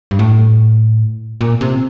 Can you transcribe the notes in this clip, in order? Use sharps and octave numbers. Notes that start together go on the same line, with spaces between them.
G2
A2
A#2
C3